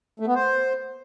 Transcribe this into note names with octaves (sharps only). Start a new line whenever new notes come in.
A3
B3
C5